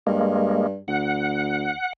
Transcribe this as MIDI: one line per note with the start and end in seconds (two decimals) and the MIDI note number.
0.07 0.78 43
0.07 0.67 56
0.07 0.67 58
0.88 1.71 38
0.88 1.93 78